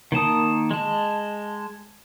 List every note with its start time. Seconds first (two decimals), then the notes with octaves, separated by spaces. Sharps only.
0.12 D#3 A#3 A5 D#6
0.71 G#3 A5